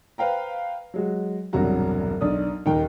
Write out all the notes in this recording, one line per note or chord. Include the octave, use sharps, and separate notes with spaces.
B4 C5 F5 G5 A#5
F#3 G#3 F#4
E1 C2 G2 F#3 F#4 A#5
B1 D4 D#6
D#1 D#2 D#4 A#4 G5